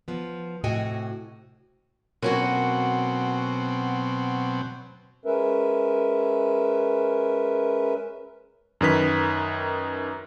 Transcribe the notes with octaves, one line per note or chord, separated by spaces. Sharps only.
F3 B3
A2 C3 F#4 D#5 G5 G#5
B2 F#3 A#3 C4 C#4 F#4
G#3 C#4 A#4 B4 E5
F#2 D#3 B4 B6